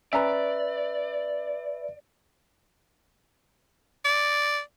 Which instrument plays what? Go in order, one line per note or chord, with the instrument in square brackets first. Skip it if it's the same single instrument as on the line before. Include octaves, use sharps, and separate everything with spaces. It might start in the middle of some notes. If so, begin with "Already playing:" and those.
[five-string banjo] C#4 A#5 [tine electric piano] B4 E5 [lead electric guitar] D5
[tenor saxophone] D5